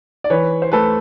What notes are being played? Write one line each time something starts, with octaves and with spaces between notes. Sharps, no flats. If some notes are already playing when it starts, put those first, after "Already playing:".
D5
E3 B4 C#5
C5
A3 A4 B4